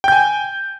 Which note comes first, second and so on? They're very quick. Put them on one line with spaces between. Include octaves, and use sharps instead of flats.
G5 G6 G#5